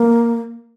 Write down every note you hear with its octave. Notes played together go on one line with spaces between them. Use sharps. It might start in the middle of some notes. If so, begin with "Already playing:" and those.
Already playing: A#3